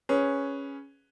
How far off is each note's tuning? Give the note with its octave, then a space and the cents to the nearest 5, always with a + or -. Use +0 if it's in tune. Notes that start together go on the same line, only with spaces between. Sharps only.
C#4 +0 G#4 +0 B4 +0